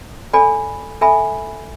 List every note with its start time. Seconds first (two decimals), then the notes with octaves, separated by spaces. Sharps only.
0.33 A4 D5 G#5 B5
1.01 A4 E5 G#5 B5